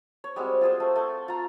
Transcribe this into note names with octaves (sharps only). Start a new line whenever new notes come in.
C#5
G3 G#3 C4 F#4
F4 G#4 C5
A3
A3
F4 A#5